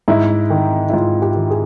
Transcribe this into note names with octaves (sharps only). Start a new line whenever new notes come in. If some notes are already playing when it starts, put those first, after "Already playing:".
G#2 E4
D#3
E4
G#2 F4
G4
D#3
G#4